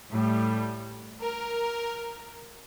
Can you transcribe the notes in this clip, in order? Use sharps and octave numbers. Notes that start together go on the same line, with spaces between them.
A2 G3
A#4